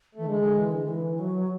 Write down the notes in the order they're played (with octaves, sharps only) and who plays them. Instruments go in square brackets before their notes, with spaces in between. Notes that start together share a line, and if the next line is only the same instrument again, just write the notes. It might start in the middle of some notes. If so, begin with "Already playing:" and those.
[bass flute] E3 [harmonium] A3
[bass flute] D3 [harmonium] G#3
[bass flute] D3
E3
D3
E3
F#3